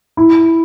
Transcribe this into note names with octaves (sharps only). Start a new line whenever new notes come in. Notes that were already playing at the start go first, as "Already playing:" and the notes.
E4